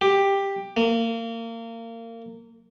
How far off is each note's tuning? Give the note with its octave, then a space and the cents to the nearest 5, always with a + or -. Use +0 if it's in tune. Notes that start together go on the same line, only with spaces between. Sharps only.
G4 +10
A#3 -30